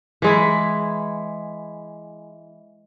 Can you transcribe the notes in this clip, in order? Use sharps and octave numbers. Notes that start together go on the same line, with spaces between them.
E3 G#3 E4